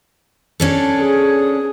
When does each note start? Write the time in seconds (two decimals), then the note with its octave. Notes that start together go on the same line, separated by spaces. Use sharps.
0.60 C#4 D4 A4
0.99 G#4